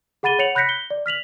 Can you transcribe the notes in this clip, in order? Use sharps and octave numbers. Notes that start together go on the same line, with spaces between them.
G#4 F#5 B5 A6 D#7 G7
C#5 F#5 C#7 F7 F#7
B5 F#6 G6 A#6 B6 C#7
G7
D5
F6 B6 F7 F#7